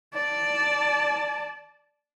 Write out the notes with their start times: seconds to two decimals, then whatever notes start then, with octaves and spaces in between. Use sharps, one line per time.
0.14 D5 A5